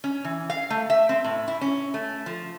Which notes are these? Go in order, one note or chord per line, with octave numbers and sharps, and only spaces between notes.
C#4
E3
F5
A3
E5
C4
A2
E4
C#4
A3
F3